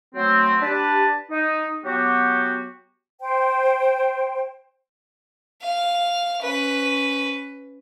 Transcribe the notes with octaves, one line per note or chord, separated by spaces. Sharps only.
F#3 A3 C4
D4 G4 B4 A5
D#4
F#3 B3 F#4 G4
C5 G5
F5
C#4 B4